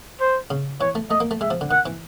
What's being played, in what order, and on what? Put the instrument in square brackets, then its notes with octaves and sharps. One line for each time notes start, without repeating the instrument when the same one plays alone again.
[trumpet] C5
[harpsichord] C#3
[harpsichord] E3 [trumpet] C#5
[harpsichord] A3
[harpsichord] A3 [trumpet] D#5
[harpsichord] A#3
A3
[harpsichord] G#3 [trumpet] E5
[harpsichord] F3
D3
[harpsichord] D#3 [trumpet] F#5
[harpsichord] E3